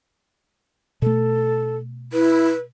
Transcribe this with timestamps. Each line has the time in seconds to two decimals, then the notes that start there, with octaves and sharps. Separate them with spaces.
1.02 B2 A3 A4
2.13 E4 B4